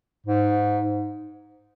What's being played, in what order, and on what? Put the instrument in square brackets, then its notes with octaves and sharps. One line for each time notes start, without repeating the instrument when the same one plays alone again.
[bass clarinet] G#2